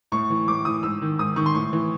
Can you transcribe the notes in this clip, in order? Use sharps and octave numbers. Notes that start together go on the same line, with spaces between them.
A2 C#6
E3
A2 D6
E3 D#6
G#2 E6
D#3
G#2 D#6
D#3 C#6
C6
A2 C#6
E3